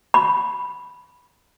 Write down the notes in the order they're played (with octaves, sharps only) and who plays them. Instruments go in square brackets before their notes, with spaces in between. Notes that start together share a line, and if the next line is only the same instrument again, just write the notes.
[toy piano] B5